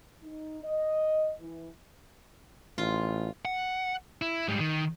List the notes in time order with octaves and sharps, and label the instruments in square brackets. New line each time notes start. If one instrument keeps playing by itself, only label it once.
[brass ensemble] D#4
D#5
E3
[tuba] A1 [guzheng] F4
[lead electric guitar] F#5
E4
G#2 G3
D#3